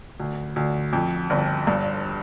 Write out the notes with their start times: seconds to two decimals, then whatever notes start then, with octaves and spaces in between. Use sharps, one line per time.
0.20 D2
0.56 D2
0.93 F2
1.30 G1
1.67 G2